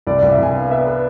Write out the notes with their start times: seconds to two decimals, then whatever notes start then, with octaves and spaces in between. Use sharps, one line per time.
0.07 C2 D5
0.19 C2 D5
0.31 E5
0.38 C2 G#5
0.55 B3 F5
0.71 B3 E5
0.87 B4